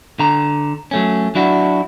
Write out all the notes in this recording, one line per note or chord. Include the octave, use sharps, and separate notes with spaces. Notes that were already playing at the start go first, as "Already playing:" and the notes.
D3 A#5
F#3 A3 C#4
F#3 D4 E4 F#4